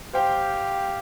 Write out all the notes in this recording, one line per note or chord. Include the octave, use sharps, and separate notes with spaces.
G4 C5 F5 G5